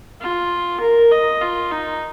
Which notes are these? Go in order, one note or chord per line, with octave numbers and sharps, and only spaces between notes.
F4
A#4
D#5
F4
D#4